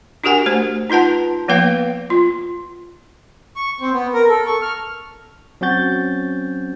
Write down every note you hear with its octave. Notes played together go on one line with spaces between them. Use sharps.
D4 F#4 G4 A#4 F#5 G#5
A3 C5
D#4 F4 B4 F#5 A5
F3 A#3 B3 B4 F5 G5
F4
C#6
C4
B3
A#4
A4
C#6
F6
F#3 C4 C#4 F#4 G6 A6